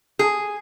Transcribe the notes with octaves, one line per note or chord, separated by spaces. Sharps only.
G#4